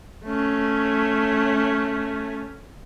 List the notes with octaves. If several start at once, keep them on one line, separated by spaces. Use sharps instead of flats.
A3 C#4